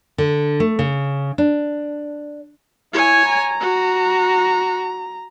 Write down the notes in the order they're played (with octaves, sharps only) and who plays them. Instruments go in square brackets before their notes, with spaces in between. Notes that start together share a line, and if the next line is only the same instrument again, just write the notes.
[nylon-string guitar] D3
A3
C#3
D4
[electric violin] E4 [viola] C#5 G#5
[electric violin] A#5
[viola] F#4